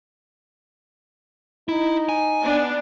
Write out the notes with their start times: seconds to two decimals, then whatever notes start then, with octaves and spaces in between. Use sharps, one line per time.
1.69 D#4 E4
2.09 G#5
2.43 B3 D4